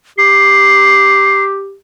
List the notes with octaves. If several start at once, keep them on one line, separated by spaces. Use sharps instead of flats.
G4 C7